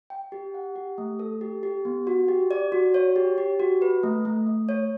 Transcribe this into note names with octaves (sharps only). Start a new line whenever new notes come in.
G5
G4
F#5
G4
A3
A4
G4
G4
B3
F#4
G4
D5
F#4
C#5
G4
G4
F#4
B4
A3
A3
A3
C#5